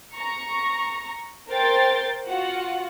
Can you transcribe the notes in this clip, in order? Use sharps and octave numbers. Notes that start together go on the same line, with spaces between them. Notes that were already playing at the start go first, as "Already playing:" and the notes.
A#5 C#6
A#4 C5 G5 C6 A6
F4 F#4 F#5